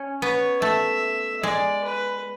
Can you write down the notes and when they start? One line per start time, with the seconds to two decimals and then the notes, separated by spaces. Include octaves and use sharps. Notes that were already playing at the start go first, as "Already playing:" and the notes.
Already playing: C#4
0.22 B3 C#5
0.62 A3 E5
1.43 G#3 D5
1.84 B4